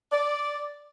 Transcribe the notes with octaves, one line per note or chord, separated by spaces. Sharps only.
D5